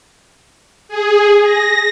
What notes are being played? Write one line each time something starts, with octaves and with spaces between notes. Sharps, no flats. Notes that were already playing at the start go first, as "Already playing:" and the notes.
G#4
A#6